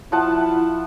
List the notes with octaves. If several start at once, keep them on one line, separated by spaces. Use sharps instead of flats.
F3 E4 F#5 A5